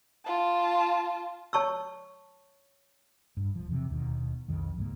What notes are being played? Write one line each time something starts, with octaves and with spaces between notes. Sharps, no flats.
F4 A5
C#5 A5 C#6 E6
G2
D#1 F3
E2 C3
D#1 D#2 B2 D#3
B1 F2 D#3
C#2 G#2 F#3 A#3